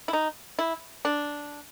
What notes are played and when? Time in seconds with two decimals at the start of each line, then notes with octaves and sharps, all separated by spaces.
0.08 E4
0.13 D#4
0.59 E4
1.05 D4